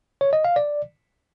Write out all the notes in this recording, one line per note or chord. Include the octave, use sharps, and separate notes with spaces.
C#5
D#5
F5
D5